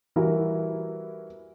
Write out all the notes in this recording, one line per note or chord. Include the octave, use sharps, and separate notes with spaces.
E3 G3 E4 F#4 A#4